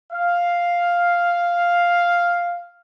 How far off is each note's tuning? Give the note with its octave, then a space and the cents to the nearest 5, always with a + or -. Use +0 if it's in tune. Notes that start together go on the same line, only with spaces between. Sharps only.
F5 +0